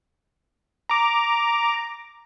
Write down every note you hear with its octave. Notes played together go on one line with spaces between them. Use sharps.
A#5 D6